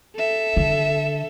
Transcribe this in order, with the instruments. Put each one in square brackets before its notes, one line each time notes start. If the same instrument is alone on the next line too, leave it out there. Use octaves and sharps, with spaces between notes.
[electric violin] A4 E5
[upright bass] D3